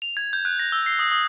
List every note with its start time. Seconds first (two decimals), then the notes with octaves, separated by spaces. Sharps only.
0.02 F7
0.17 G#6
0.33 G6
0.45 F#6
0.59 A#6
0.72 E6
0.86 C7
0.99 D#6
1.12 D#6